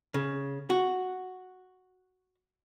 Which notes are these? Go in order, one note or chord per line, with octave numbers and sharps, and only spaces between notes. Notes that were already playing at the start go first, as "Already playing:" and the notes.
C#3
F#4